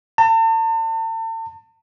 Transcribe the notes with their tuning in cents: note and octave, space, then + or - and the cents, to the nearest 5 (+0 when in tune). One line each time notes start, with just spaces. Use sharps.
A5 +40